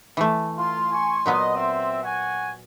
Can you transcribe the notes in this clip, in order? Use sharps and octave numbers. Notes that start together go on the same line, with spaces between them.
E3 A3
F4 C6
G#5 C#6
A#2 F#3 B3 D#5
C4 E5
F#4 F#5 G#5